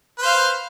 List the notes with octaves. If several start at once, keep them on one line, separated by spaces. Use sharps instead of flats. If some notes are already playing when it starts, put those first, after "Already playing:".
B4 C5 F5